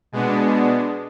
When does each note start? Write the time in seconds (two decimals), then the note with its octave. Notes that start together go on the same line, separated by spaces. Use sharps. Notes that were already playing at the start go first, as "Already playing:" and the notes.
0.12 B2 G#3 B3 D4